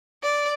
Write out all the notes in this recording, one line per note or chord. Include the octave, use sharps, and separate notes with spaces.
D5